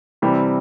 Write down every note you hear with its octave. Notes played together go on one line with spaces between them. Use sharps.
C3 E3 G3 C4 E4